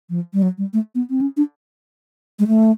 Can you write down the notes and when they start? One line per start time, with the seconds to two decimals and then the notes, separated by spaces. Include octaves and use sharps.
0.10 F3
0.33 G3
0.42 F#3
0.58 G3
0.73 A3
0.95 B3
1.10 C4
1.21 C#4
1.37 D4
2.39 G#3
2.48 A3